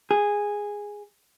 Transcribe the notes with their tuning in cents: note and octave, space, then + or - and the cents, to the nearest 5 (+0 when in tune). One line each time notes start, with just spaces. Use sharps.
G#4 -10